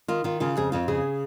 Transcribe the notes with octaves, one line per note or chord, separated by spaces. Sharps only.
D#3 F4
D#3 F4
C#3 F4
F2 G#4
F2 F4
C#3 G#4